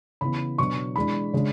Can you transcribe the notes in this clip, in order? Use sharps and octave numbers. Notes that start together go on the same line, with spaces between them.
C#3 E3 B3 B5
B2 F#3 B3 D4 C#6
E3 G#3 D4 B5
C#3 G#3 D4